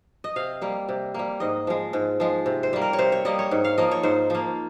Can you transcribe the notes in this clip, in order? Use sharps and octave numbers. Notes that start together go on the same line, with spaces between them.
D#5
C3 F5
G3 A#3
C3
G3 A#3
G#2 D#5
F3 G#3
G#2
F3 G#3
C3
C5
G3 A#3
A#4
C#5
C3 C5
C#5
G3 A#3 D#5
C#5
G#2
F5
F3 A#3 D#5
C#5
G#2 C5
F3 A#3